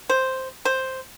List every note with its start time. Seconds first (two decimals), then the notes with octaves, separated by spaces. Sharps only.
0.09 C5
0.65 C5